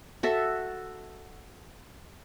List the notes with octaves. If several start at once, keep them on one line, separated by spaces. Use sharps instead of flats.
F#4 A4 E5